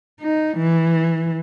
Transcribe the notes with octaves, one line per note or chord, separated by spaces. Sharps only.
D#4
E3